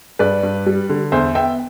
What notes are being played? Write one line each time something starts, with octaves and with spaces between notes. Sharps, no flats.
G2 B4 D5
G2
G3
D3
E2 C5 E5
B3 E5 G5